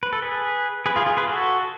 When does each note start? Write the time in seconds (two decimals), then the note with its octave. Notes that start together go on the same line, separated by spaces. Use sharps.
0.03 B4
0.13 A4
0.22 G#4 B4
0.86 G#4 B4
0.96 F4 G#4
1.06 F4 G#4
1.17 G#4 B4
1.28 F#4 A4